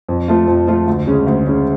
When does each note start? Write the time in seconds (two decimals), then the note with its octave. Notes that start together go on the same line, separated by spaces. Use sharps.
0.09 F2
0.28 F3 A3 F4
0.48 F2
0.68 F3 A3 F4
0.87 D2
1.07 C#3 G#3 C#4
1.27 D2
1.46 C#3 G#3 C#4